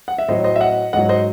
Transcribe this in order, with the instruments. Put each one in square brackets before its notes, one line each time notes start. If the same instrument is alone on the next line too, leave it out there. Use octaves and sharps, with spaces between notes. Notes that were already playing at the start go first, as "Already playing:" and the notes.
[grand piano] F#5
E5
A2 F#3 C5 D#5
C5 D#5
E5
D#5 F#5
G#2 F#3 D#5 F#5
C5 D#5